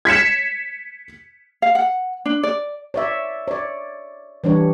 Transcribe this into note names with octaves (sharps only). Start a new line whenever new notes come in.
G#6 B6 C#7 E7
F5
F#5
D4
D5
C#5 D5 E5
C#5 D5
E3 G3 D4 C#5